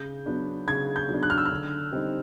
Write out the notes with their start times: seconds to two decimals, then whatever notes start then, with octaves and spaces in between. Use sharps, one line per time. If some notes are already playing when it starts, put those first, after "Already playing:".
Already playing: C#3 G6
0.26 F#3 B3 D4
0.68 C#3 G#6
0.96 G6
1.09 F#3 B3 D4
1.23 F#6
1.30 F6
1.38 E6
1.45 F6
1.51 D3
1.92 G3 C4 D#4